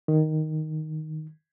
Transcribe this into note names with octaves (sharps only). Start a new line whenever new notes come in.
D#3